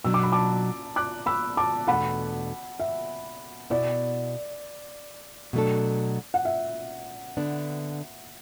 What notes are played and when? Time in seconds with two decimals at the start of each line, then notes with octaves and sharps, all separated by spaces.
0.04 B2 F#3 D4 E6
0.14 D6
0.23 B5
0.32 A5 D6
0.96 D6 F#6
1.26 B5 E6
1.57 A5 D6
1.87 E2 B2 A3 D4 A4 F#5 B5
2.80 E5
3.70 B2 B3 E4 D5
5.53 B2 F#3 A3 D4 A4
6.34 F#5
6.45 E5
7.37 D3 B3 D4